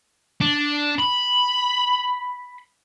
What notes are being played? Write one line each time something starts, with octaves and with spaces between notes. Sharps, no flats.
D4
B5